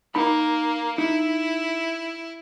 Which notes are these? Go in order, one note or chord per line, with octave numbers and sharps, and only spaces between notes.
A#3 D#4 B5
D#4 E4